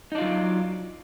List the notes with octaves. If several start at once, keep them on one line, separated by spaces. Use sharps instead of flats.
F#3 D4 D#4 F4